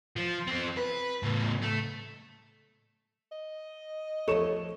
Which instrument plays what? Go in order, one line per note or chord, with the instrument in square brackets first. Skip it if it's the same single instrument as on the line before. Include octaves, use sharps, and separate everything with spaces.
[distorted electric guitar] F3
F3 C4
B4
A2 C#3
A3
[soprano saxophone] D#5
[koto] F3 A3 C#5 [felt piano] A4 E7